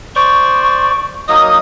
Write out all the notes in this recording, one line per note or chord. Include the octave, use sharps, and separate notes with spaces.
C5 D5 C#6
F#3 A#3 D#4 D#5 D#6